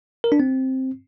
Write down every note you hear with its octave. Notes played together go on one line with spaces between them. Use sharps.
A#4
D4
C4